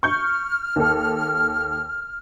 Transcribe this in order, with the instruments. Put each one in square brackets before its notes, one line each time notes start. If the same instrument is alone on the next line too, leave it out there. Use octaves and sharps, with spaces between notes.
[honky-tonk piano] C#6 G6 [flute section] F6
[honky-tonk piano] D#2 A4